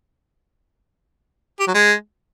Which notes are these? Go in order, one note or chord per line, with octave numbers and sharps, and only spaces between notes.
G4
F#3
G#3